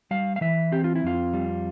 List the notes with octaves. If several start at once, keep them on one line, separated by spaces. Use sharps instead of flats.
G3 F5
F5
E3 E5
C4 G4
F4
E4
F2 F4
G3